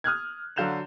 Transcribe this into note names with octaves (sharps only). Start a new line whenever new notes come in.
D#6 F6 F#6 G#6
D3 F#3 F5 G6 E7 F7